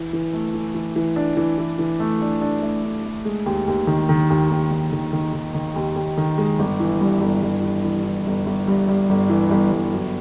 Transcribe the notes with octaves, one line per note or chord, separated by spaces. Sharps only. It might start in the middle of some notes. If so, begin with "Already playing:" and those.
Already playing: E3
E3
A3
E3
E3
E3
D4
E3
E3
E3
A3
D4
D4
A3
D4
A3
G#3
D#2
D#2
D#3
D#3
D#2
D#2
D#3
D#3
D#3
D#3
D#3
D#2
D#2
D#3
G#3
G1
E3
G2
G1
G1
E3
E3
E3
G1
G1
G2
G2
G1
E3
G1
G1
F#2